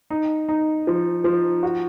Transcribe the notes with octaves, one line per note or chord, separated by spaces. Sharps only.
D#4
D#4
F3
F3
F#4